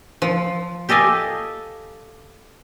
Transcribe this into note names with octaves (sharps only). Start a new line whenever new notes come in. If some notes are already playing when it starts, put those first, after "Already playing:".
F3
G4 A4 D#5 F5 G#5